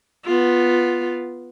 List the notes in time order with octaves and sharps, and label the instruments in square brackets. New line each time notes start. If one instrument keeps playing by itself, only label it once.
[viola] B3 F4